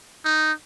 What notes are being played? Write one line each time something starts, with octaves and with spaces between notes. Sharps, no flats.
D#4